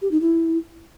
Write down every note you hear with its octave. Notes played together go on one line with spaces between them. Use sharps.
G4
D#4
E4